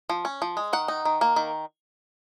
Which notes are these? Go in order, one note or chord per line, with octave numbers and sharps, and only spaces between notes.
F3
C#4
F3
G#3
D#3 F#5
D#4
D#3
A#3
D#3